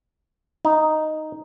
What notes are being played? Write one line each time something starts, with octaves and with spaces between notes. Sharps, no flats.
D#4